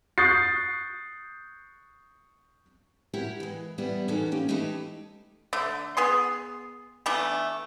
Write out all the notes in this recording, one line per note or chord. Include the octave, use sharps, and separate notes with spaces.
C#6 D#6 F#6 G6 A6 C7
E4 F#4 G4 A#4 C#5 F#5
E3 G#3
E2 G3 B3 E4
E3 C#4 D#4 F#4 A4 A#4
A#3 C#4 G4
E3 G#3 A3 D#4 G4 E5
D3 A3
B3 G#4 C6
E3 A3 B3 D4